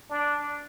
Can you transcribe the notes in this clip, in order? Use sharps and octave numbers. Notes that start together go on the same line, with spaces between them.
D4